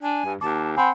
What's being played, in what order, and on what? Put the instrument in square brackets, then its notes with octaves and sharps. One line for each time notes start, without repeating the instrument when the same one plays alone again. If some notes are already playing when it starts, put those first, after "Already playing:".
[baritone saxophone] D4 [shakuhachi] G#5
[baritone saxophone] G2
[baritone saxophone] D#2 [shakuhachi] A5 [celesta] D6
[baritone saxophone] C4 [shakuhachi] F#5 [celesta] G#5 B5 C6